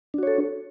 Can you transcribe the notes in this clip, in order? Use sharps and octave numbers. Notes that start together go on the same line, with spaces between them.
D4 F#4 A4 C#5